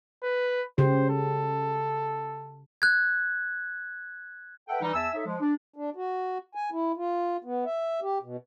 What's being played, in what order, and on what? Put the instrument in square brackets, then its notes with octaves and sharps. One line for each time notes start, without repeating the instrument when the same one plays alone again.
[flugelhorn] B4
[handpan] C#3 G4 [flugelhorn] C5
[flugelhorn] A4
[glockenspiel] F#6 G#6
[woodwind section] A4 B4 E5 F#5 G5
E3 G3 D#4
E2 E5 G#5 A5 E6
D#4 A4 C#5 E5
F3 G#3
D4
[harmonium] D4
F#4
G#5
E4
F4
B3
E5
G4
B2